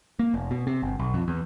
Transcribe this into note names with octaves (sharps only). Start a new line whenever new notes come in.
A#3
F1
B2
C3
G1
B1
F2
E2